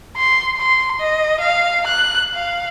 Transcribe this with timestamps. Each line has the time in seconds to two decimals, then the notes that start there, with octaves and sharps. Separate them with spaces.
0.18 C6
0.56 C6
1.00 D#5
1.41 F5
1.87 F#6
2.35 F5